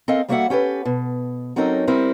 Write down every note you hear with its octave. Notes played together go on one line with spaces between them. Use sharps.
C4 A4 A#4 D#5 F5
G3 A#3 F#4 A4 E5 F#5
C#4 G4 A4 B4
B2
F#3 C4 C#4 D#4 A4 A#4
G3 C4 E4 A#4